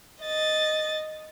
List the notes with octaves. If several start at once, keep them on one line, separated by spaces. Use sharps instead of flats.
D#5 A6